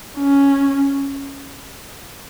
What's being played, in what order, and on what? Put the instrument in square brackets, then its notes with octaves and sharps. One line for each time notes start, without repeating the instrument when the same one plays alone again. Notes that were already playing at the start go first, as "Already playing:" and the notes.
[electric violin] C#4